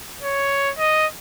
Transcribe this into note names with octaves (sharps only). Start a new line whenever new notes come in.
C#5
D#5